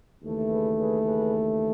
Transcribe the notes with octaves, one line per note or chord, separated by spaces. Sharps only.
D#2 C#3 E3 A3
G#4 B4
G#4 B4
G#4 B4